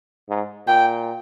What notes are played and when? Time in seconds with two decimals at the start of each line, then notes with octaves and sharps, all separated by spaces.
0.29 G#2
0.67 A#2 G5